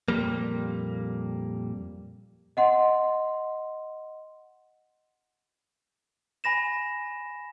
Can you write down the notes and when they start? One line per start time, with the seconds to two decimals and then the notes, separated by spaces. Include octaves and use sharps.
0.08 F2 A#2 G3 A#3
2.57 D#5 F#5 C6
6.44 G#5 B5 A#6 E7